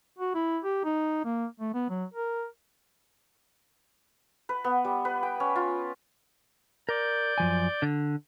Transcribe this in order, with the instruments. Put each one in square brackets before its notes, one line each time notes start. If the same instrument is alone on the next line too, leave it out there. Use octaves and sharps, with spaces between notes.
[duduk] F#4
E4
G4
D#4
A#3
A3
B3
F#3
A#4
[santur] B4
B3
G3
B4
G5
C#4
F4
[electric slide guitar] A#4 [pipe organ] D5 G6
[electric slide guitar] F#2 F3 G#5
D3